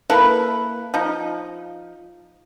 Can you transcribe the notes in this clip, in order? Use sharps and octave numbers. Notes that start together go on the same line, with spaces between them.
A#3 E4 A4 B4
F3 D#4